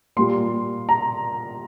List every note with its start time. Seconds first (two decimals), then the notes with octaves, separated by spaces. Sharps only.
0.16 A#2 G3 A#3 C6
0.89 A#5